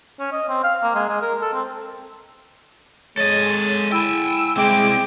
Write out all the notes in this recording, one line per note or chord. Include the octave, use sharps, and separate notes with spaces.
C#4
D#5
C4
F5
A#3
G#3
G#3
A#4
A4
C4
G#3 A4 C#5 D#5 A6
E4 G5 G#5 E6
G#3 C4 E4 G5 D6